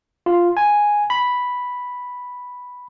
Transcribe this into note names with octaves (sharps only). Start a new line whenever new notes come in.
F4
G#5
B5